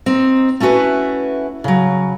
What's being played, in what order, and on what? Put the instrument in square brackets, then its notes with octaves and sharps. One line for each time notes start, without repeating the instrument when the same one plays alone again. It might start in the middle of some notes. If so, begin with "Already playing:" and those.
[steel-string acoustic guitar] C4 D#4
A3 C#4 E4 F#4 B4
C#3 F#3